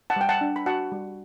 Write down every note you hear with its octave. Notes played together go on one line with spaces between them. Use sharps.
F#5 A5
G3 G5
F#5 A5
D4
B5
F#4 F#5 A5
G3